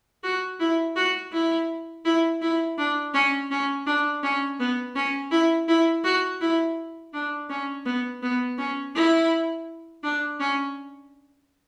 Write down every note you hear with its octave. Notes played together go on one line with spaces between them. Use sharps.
F#4
E4
F#4
E4
E4
E4
D4
C#4
C#4
D4
C#4
B3
C#4
E4
E4
F#4
E4
D4
C#4
B3
B3
C#4
E4
D4
C#4